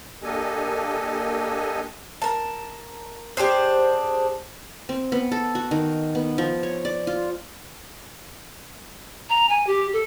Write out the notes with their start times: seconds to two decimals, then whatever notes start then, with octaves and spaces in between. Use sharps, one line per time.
0.23 A#3 D4 G4 A4 D#5 G#5
2.22 A#4 A5
3.37 D4 G4 G#4 C5
4.89 C4
5.12 B3
5.32 A4
5.55 F#4
5.71 D#3
6.15 B3
6.38 F3
6.63 C#5
6.85 D5
7.07 F4
9.29 A#5
9.49 G#5
9.67 G4
9.93 A4